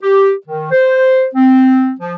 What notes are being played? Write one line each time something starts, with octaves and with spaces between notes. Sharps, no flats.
G4
D#3
C5
C4
F3